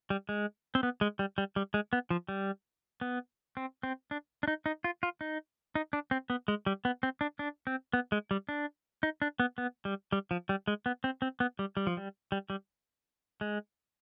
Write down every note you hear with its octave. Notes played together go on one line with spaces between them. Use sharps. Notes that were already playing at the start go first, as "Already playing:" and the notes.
G3
G#3
C4
B3
G#3
G3
G3
G3
G#3
B3
F3
G3
B3
C4
C4
D4
D4
D#4
D#4
F4
F4
D#4
D#4
D4
C4
B3
G#3
G3
B3
C4
D4
D4
C4
B3
G#3
G3
D4
D#4
D4
B3
B3
G3
G3
F3
G3
G#3
B3
C4
C4
B3
G3
G3
F3
G3
G3
G3
G#3